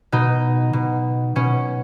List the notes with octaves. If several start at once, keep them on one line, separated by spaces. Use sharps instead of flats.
B2 D#4
B2
B2 C#4